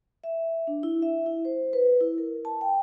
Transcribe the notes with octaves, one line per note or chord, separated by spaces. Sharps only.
E5
D4
E4
E5
E4
C5
B4
E4
A#4
A5
G5